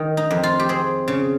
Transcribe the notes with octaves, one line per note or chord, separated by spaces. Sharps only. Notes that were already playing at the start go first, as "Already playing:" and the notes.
Already playing: D#3
D#4
F2
F4
G4
C4 G#4
C#3